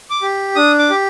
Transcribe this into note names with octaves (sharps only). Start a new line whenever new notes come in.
D6
G4
D4 D#6
D6
G4